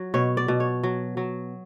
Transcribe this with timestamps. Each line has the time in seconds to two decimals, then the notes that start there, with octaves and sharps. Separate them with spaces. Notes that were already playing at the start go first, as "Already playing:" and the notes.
Already playing: F#3
0.14 B2 C#5
0.37 D5
0.48 B2
0.60 C#5
0.83 F#3
1.17 F#3